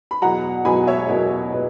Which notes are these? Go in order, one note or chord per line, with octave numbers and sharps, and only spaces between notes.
B5
E2 B2 F#3 F#5 A#5
E2 B2 F#3 G#5 B5
C#5 E5
E2 B2 F#3 A#4 C#5
B2 B4